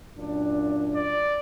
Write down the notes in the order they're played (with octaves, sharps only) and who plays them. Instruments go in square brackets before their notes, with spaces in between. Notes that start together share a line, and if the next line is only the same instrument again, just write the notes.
[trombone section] F#2 A#2 D4
[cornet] D5